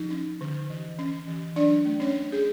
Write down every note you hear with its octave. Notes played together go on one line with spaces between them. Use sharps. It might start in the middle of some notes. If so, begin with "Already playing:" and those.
Already playing: F3 D#4
C#4
D3
E3
C#4
E3
F#3 D4 D5
A3
C#4 C#5
C#4
G#4